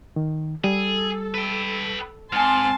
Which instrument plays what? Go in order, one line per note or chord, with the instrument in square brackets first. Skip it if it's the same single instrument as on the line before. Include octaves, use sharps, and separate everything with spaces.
[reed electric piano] D#3
[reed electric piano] G3 [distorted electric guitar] G#4 [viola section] A4
[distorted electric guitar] B4 G5
[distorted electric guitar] G#2 [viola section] C4 A5 C6 [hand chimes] G#5 F6